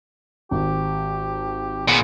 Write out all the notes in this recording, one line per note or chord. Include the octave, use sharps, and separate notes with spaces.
G#1 G4
A#2 B3 G#4